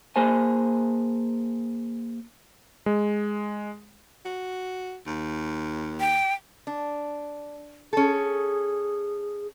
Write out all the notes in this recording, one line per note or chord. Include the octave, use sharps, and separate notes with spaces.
A#3 G#4 C5 G#5
G#3
F#4
D#2
G5
D4
C#4 G#4 A4